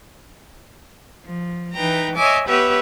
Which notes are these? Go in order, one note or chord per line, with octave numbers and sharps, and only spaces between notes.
F3
E3 D#4 B4 G5 A#5
C#5 D#5 E5 G#5 D6
B3 G4 B4 C#5 E5